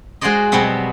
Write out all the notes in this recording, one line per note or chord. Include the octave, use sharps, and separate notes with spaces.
G#3 F#4 G#4 C5 D5 D#5
B2 F#3 G3 B3 C4